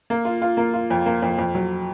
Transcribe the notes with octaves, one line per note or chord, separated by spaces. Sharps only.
A#3
F4
F4
A#3
F4
F2
A#3
F2
F2
F#3